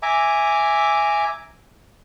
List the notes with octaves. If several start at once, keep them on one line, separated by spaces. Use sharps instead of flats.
E5 G#5 A#5 D6